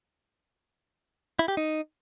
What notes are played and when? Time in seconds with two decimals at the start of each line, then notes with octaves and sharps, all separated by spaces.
1.39 E4
1.48 G4
1.57 D#4